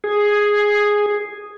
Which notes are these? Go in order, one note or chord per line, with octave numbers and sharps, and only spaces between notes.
G#4